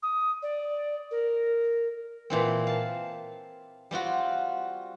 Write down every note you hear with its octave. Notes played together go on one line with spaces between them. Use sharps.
D#6
D5
A#4
A#2 E3 C4
F5 A5
G3 C4 F4 F#4